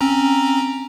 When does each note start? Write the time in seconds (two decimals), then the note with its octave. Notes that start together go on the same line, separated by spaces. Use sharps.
0.01 C4 C#4 A#5